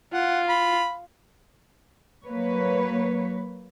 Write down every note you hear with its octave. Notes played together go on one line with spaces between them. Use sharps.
F4 F#5
B5
F#3 A#3 B4 C#5